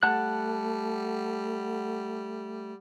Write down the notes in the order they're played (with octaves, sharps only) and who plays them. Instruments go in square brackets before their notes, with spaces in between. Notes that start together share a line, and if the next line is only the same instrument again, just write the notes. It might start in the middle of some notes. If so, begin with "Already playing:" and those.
[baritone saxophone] G3 [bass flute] A3 [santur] F#5 [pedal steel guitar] A5 F#6